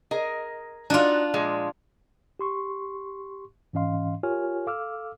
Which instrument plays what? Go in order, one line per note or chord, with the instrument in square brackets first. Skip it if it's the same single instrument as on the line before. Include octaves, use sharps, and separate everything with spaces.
[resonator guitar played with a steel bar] G#4 A#4 D#5
[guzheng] D4 F4 [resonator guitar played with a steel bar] D#4 F#4 D5
[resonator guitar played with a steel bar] A#2 F3 G#3
[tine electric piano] G4 C6 C#6
G#2 E3 C#4 D#5 F5 C6
F4 G4 A#4 C#5 G#5 F6
A4 F5 D6 E6 F6